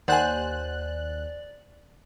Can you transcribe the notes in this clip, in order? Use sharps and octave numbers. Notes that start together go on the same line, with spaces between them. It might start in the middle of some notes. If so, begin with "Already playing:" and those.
D#2 C5 D5 F#5 G#5 B5 C6 F#6